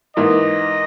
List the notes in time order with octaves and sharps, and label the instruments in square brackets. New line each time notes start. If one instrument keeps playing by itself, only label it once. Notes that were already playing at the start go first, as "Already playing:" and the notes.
[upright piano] G#2 E3 A#3 [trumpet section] D#5